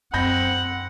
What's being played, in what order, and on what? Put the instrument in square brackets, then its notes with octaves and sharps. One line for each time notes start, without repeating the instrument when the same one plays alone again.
[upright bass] F#2 [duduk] C4 [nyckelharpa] F#5 [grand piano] B5 G6 A#6